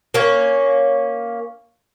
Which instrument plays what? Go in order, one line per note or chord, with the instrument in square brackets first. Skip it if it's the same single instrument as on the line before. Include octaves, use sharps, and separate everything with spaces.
[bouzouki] A#3 C#4